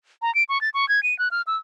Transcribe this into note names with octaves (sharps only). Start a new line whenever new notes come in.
A#5
D7
C#6
A6
C#6
G#6
D#7
F#6
F6
E6